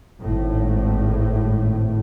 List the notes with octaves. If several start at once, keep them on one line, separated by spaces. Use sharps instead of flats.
G#1 A2